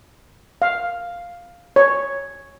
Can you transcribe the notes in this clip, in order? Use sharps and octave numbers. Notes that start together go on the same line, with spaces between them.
F5
C#5